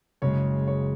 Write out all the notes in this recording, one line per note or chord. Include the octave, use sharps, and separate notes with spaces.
F#1 F#2 C#3 G#3 C#5
C#5